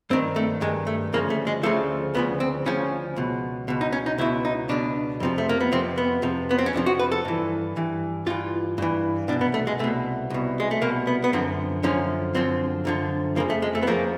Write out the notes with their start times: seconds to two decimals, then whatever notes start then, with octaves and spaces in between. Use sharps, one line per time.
0.10 G2 D#3 C4
0.36 A3
0.61 G2 D#3 G#3
0.87 A3
1.13 D2 C#3 F3 A#3
1.30 A3
1.47 G#3
1.63 D2 C#3 F3 A3
2.14 D2 C#3 F3 B3
2.40 C4
2.66 D2 C#3 F3 C#4
3.16 C#2 B2
3.68 C#2 B2
3.81 D#4
3.93 C#4
4.06 D#4
4.18 C#2 B2 E4
4.45 D#4
4.69 C#2 B2 D4
5.20 F2 C3 F3
5.38 A3
5.49 A#3
5.61 B3
5.72 F2 C3 F3 C4
5.98 B3
6.22 F2 C3 F3
6.51 B3
6.59 C4
6.66 C#4
6.73 F2 C3 F3 D4
6.86 F#4
6.99 B4
7.12 A4
7.25 G2 E3
7.76 G2 E3
8.26 G2 E3 F4
8.78 G2 E3
9.28 B2 D4
9.32 C2
9.41 B3
9.54 A3
9.67 G#3
9.79 C2 A3
9.84 B2
10.30 C2 B2
10.60 G#3
10.71 A3
10.81 C2 B2 A#3
11.07 B3
11.24 B3
11.33 F#2 D3 F3 C4
11.83 F#2 D3 F3 C#4
12.34 F#2 D3 F3 C4
12.85 F#2 D3 F3
13.36 F2 C#3 F3 A#3
13.50 A3
13.62 G#3
13.75 A3
13.83 B3
13.87 F2 C#3 F3 A#3